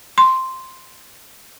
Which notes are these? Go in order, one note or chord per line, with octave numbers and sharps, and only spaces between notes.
C6